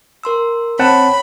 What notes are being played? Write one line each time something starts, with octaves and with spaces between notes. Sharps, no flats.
A#4 C6 E6
C4 C#5 F#5 A5 B5